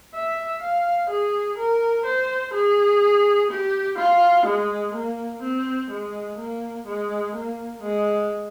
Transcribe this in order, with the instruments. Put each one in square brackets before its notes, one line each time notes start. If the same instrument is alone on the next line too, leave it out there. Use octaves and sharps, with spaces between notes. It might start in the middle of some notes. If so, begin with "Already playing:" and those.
[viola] E5
F5
G#4
A#4
C5
G#4
G4
F4
G#3
A#3
C4
G#3
A#3
G#3
A#3
G#3